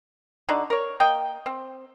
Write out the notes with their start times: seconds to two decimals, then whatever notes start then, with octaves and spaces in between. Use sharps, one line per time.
0.49 D3 D4 D#4 F#4
0.70 A#4 C#5
1.00 A#3 D#5 G5
1.46 C4